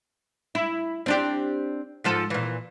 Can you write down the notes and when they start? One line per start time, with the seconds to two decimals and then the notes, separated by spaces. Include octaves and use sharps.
0.55 E4
1.06 C4 D4 G4
2.04 G#2 F3 A4
2.30 A#2 E3